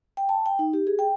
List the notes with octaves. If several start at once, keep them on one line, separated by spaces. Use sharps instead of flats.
G5
A5
G5
D#4
G4
G#4
G5